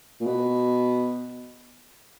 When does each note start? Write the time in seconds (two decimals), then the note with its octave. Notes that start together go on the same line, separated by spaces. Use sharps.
0.21 A#2
0.27 B2